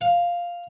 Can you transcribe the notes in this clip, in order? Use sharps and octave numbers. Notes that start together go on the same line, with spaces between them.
F5